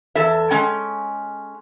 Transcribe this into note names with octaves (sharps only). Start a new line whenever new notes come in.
E2 A4 E5
G#3 C#4 G5